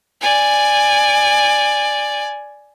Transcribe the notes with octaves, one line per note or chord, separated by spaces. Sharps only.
D5 G#5